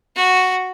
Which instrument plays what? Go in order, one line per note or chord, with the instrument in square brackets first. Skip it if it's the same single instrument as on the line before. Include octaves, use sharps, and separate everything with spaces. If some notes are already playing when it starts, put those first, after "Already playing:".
[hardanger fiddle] F#4